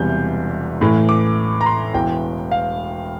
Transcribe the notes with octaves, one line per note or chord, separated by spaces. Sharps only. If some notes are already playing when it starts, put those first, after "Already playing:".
Already playing: E1 E2 C3 G3 G6
A1 A2 E3 A3
D6
A#5
C6
E1 E2 E3 G5
F5